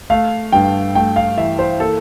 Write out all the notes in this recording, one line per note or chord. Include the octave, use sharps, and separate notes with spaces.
A3 F5
G2 G5
A3 G5
F5
E3 E5
C5
A#3 A4